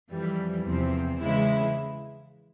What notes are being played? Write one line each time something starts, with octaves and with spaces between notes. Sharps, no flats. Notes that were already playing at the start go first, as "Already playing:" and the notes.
F2 E3 G3
E2 C3 F3 C4
C#3 E3 G#3 E4